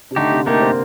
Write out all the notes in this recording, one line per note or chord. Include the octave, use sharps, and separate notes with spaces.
C3
D3 A3 D#4 G4
C3
A3 A#3 D#4 G4
C4